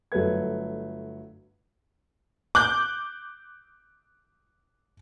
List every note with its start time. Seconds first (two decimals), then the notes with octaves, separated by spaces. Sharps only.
0.12 G1 F#3 A3 B4 G#6
2.55 D6 F#6 G6